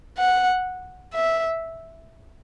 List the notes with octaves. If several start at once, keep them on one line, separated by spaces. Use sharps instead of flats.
F#5
E5